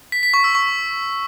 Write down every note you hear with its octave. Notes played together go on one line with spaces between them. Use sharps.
B6
B6
C#6
E6
C#6